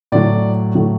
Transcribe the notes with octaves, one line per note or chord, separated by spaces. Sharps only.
A2 F#3 D5
A2 F#3